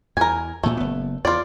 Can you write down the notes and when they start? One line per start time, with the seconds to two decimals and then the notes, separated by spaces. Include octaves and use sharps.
0.17 E2 A#4 G#5
0.64 D2 A#2 A3
0.77 F#1 B3
1.25 E2 F4 D5